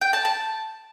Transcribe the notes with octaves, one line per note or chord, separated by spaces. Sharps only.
G5
A5
A5